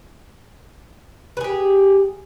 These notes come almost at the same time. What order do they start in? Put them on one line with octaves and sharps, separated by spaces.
B4 G#4 G4